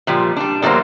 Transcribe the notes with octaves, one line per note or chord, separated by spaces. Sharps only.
A#2 F3 G3
G3 D4
E2 D#3 F#3 G3 A#3 C5